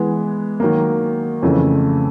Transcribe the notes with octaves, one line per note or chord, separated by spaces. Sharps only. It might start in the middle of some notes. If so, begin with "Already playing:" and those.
Already playing: E3 G#3 B3
D#3 F#3 A#3
F2 C#3 E3 A3 C#4